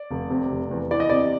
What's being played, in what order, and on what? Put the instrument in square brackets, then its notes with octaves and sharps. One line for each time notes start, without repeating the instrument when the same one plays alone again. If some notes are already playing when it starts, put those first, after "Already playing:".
Already playing: [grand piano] D5
F1
C3
F1
E2
E3 D5
D#5
C3 D5